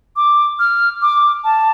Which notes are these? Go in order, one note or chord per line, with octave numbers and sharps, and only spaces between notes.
D6
F6
D6
A5